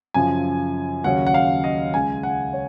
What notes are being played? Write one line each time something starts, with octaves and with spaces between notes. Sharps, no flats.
F#2 C#3 F3 G#5
D#2 C#3 F#3 C#4 F#5
F#5
F5
D#5
C#2 C#3 G#3 G#5
F#5
C#5